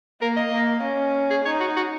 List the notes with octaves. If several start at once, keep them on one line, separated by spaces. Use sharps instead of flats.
A#3 A#4
D#5
A#3
C#4
G#4
D#4 C#5
F#4
F#4